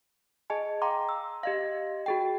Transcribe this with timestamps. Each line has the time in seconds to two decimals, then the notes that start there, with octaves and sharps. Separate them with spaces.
0.50 G#4 D#5 G#5 A5
0.82 F5 G5 A#5 C6 D6
1.09 E6
1.43 G4 D#5 F5
2.06 F#4 G#4 G5